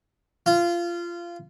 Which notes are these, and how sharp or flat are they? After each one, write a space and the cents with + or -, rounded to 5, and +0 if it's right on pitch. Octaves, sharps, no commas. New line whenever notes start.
F4 -20